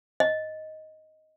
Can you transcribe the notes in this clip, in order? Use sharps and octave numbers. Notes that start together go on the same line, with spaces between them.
D#5